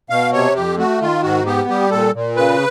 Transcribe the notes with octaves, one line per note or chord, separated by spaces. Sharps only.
B2 F5
C3 C#5
F2 G4
A3 F#4
D#3 F4
G#2 F#4
B3 G4
G3 G4
A#2 A4
A#2
C#3 B4